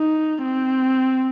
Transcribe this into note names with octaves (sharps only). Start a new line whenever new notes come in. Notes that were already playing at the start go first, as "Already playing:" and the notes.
Already playing: D#4
C4